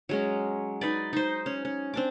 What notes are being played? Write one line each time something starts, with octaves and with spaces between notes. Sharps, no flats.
F#3 G#3 C#4
D#4 B4 D5
D#4 C5
C#4
C#4
C4 D4 D6